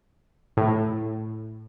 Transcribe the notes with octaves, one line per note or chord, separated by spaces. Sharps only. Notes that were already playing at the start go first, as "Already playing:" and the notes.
A2